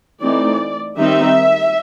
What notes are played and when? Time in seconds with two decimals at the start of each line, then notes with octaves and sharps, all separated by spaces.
0.20 E3 A3 C4 D#4 D5
0.98 D#3 G3 C4 D#4 E5